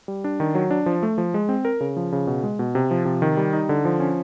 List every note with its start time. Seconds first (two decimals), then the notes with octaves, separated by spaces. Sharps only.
0.08 G3
0.24 D4
0.40 D#3
0.55 F#3
0.71 D4
0.86 F3
1.03 A3
1.18 F3
1.34 G#3
1.49 C4
1.65 A#4
1.81 C#3
1.97 F3
2.12 C#3
2.27 B2
2.44 G#3
2.59 B2
2.75 C3
2.91 F3
3.05 C3
3.22 D#3
3.37 G3
3.53 D#4
3.69 D3
3.85 F3
4.00 C#4